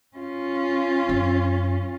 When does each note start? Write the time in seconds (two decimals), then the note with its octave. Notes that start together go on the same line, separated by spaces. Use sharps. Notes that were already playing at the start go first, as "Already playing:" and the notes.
0.17 C#4 F4
1.09 F#2